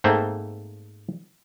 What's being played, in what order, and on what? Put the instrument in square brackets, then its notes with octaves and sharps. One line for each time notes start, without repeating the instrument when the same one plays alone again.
[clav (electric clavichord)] G#2 A3 A#3 C4 C5